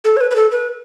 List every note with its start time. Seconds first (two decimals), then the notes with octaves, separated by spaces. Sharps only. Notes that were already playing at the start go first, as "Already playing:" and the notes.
0.04 A4
0.17 C#5
0.21 B4
0.31 B4
0.36 A4
0.52 B4